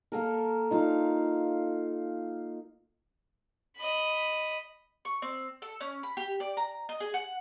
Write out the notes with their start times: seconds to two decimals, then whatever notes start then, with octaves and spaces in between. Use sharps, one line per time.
0.12 A#3 A4 A#4
0.71 D#4 F4 F5
3.77 D#5 B5
5.05 C#6
5.22 C4
5.62 A4
5.81 C#4
6.03 B5
6.17 G4
6.40 D5
6.57 A#5
6.89 D#5
7.00 G#4
7.14 F#5